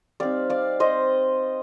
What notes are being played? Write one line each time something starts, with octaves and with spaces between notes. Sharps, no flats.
G3 C4 D#4 D5 F5
D5 F5
C5 D#5